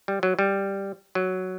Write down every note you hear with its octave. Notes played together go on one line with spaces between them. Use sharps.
G3
F#3
G3
F#3